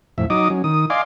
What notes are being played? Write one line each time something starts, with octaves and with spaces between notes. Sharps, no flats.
F2 A2 E5
F#3 D#4 D#5 D6 D#6
F#3 C#4
D#3 D#6
D5 D#5 F5 G#5 C6 D6